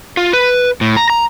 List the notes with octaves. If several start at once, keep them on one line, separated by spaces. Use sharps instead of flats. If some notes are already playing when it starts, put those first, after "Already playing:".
F4
B4
A2
A#5
A#5